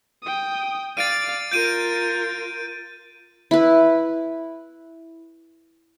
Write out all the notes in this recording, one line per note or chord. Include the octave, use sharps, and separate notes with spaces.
G5 D#6
D5 F5 A6 D7 D#7
F4 A#4 G6 D7 D#7
E4 B4